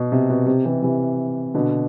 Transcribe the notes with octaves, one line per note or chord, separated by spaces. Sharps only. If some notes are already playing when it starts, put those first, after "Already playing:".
Already playing: B2
C3
B2
C3
C3 E3
C3 E3
B2 D3